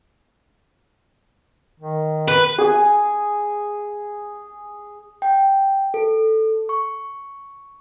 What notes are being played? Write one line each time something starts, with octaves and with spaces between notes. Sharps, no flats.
D#3
B4
G#4 G#5
G5
A4
C#6